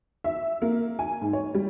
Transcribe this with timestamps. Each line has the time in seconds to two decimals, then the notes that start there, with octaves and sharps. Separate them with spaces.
0.24 E5
0.62 A#3
0.99 G#5
1.21 G#2
1.33 C#5
1.55 G3